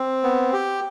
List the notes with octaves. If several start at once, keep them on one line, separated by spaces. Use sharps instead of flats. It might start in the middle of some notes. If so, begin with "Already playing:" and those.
Already playing: C4
B3
G4